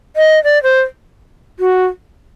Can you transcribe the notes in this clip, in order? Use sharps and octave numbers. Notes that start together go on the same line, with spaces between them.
D#5
D5
C5
F#4